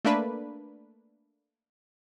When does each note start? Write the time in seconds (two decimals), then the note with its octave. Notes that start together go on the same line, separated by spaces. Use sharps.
0.05 A3 A#3 D4 B4